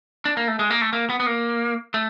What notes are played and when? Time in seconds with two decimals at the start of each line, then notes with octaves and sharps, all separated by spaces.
0.25 D4
0.37 A#3
0.48 A3
0.59 G#3
0.70 A#3
0.81 A3
0.93 A#3
1.10 B3
1.20 B3
1.26 A#3
1.94 A3